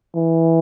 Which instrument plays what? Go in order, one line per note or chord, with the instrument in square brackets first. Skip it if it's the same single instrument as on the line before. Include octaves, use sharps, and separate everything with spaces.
[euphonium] E3